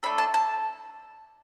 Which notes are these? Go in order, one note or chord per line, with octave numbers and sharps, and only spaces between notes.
A3 D4 A4 B5
A5
A5